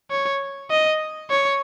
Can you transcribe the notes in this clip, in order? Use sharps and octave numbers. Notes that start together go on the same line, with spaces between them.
C#5
D#5
C#5